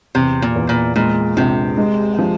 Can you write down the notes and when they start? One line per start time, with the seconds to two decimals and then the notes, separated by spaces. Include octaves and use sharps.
0.15 E2 C3
0.42 A#2
0.56 E2
0.69 A#2
0.96 A#2 G#3
1.37 A#1 C3
1.77 G#3
2.19 F3